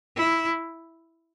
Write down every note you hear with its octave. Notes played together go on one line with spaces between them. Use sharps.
E4